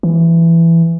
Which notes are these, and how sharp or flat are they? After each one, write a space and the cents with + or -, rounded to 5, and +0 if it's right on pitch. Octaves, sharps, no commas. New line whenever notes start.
E3 +15